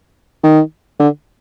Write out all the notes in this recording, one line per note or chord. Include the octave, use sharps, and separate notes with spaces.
D#3
D3